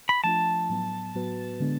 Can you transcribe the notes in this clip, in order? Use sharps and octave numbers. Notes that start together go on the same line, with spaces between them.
B5
F3 A3 D4 F4 A5
A2 F#3 B3
A2 F#3 B3 F#4 B4
D3 G#3 B3 D4